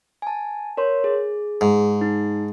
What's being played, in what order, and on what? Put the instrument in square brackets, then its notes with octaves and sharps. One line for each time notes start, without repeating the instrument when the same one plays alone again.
[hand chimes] G#5 A5
A#4 C#5 C6
G#4
[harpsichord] G#2
[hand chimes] D#4